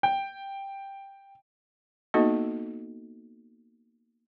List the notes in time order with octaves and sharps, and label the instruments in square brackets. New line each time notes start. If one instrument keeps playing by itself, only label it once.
[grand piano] G5
[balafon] A#3 B3 D#4 F#4 A4 D#5